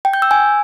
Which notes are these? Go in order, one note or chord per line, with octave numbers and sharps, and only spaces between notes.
G5
G6
E6
G#5